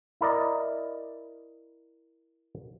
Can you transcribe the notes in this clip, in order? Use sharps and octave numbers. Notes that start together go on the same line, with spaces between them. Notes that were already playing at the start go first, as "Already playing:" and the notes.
E4 A#4 D5 D#5